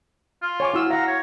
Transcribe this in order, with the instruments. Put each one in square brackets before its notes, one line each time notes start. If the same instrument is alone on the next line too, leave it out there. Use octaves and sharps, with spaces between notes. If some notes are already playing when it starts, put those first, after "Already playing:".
[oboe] F4
[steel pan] C#5 G#5 D6
E4 F#4 E6
[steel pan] F5 F#5 [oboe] A#5
[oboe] C#5